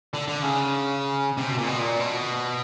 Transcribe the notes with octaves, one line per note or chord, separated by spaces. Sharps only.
D3
D3
C#3
C3
B2
A#2
B2
A#2
B2